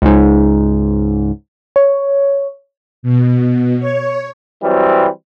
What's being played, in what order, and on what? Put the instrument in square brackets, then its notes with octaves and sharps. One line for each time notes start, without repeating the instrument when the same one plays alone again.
[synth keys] C#2 G#2
[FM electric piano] C#5
[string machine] B2
C#5
[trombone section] E3 F#3 G3 C4